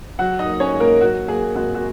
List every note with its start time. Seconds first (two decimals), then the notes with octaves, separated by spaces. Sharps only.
0.19 F#3 F#4 F#5
0.39 D#4 D#5
0.46 A#3
0.60 C#4 C#5
0.74 G#2
0.80 A#3 A#4
1.01 F#3 F#4
1.28 A#3 G#4
1.55 G#1 F#4
1.75 F#4